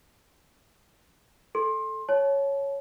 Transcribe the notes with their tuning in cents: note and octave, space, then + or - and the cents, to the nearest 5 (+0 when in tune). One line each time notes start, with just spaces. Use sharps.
A4 +0 C6 +20
C#5 +0 A5 -30